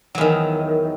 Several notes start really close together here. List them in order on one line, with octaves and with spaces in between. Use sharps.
F#3 E2 D#3